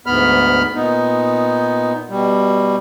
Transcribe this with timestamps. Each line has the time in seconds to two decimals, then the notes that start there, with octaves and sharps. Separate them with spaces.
0.06 D2 G#2 B3 B5 F6
0.75 A#2 B3 D#4
2.10 B2 G3